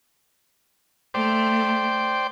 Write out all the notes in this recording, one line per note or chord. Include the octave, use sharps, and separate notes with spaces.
A3 C5 D5 G5